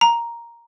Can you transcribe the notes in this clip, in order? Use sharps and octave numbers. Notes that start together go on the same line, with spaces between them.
A#5